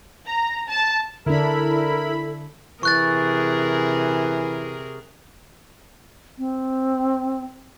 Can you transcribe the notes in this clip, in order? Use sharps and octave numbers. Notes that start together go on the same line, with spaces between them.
A#5
A5
D3 D4 E4 A4 A#4 B5
C3 E3 G#4 A#4 C#6 F#6 A6
C4